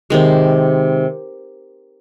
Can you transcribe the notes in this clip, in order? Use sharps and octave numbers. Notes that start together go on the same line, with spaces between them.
C3 D#3 G#3